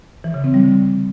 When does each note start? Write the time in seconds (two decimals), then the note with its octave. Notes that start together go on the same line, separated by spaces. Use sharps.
0.24 E3
0.34 C#3
0.44 C4
0.54 G3
0.64 D3